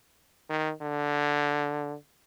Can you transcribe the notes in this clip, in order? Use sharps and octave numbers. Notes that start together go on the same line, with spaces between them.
D#3
D3